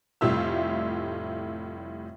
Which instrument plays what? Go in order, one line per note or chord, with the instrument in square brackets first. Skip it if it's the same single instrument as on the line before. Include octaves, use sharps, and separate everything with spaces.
[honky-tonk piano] F1 A2 G3 F4 E5 E6